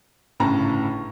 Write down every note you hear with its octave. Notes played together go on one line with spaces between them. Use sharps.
G1 A2 C#3 A5 A#5